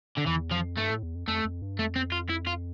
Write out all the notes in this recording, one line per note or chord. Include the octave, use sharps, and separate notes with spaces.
D3
E2 E3
F2 F3
G2 A3
A2
E2
F2
F2 A3
F2
G2
F2 A3
C4
F4
E4
F4